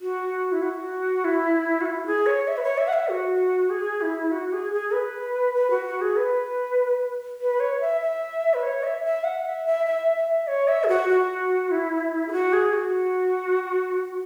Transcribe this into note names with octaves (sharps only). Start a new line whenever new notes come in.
F#4
E4
F#4
E4
F#4
E4
G#4
C#5
E5
B4
C#5
E5
F#5
E5
F#4
G#4
E4
F#4
G#4
G#4
B4
B4
F#4
F#4
G#4
B4
B4
C#5
E5
E5
B4
C#5
E5
E5
F#5
E5
E5
E5
E5
C#5
E5
G#4
F#4
F#4
E4
G#4
F#4
G#4
F#4